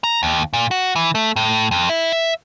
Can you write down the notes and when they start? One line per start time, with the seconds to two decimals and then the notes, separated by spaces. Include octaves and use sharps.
0.04 A#5
0.23 D#2
0.53 A#2
0.71 F#4
0.96 E3
1.15 A3
1.36 A2
1.71 F2
1.89 E4
2.12 E5